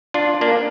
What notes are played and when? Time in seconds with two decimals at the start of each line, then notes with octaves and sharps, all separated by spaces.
0.14 D4 F4
0.41 A#3 D4